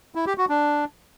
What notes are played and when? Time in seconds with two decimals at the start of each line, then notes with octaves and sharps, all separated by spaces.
0.15 E4
0.26 G4
0.38 F#4
0.49 D4